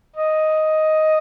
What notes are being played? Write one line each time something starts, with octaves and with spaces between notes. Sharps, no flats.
D#5